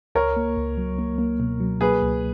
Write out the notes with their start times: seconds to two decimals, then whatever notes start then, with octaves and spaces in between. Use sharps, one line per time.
0.15 C#2 A#4 C#5
0.36 A#3
0.57 C#2
0.78 F#3
0.99 A#3
1.18 A#3
1.40 B2
1.60 F#3
1.81 A#3 G#4 B4
2.02 C#2